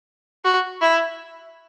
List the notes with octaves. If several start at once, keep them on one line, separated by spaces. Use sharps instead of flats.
F#4
E4